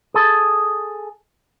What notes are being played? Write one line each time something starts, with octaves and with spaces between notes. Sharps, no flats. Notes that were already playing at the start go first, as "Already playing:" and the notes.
G#4 A4